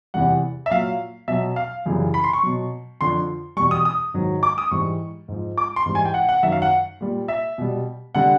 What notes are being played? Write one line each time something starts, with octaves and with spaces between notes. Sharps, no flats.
E2 C3 E3 G3 F#5
E5
A#2 F#3 F5
B2 F#3 E5
F5
F#2 C#3 E3 G3
B5
C6
C#6
B2 F#3
F2 D3 F3 C6
E2 B2 G3 C#6
D#6
D#6
G#2 D#3 F#3
D6
D#6
G#2 E3 G3 C#6
G#2 F3
D6
C6
G#2 E3 G3
G#5
G5
F#5
F#5
F#2 D#3 F#3 E5
F5
F#5
A#2 G3
E5
B2 G3
D3 G3 F#5